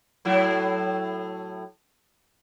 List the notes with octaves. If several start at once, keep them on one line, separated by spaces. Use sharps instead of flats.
A2 F#3 E4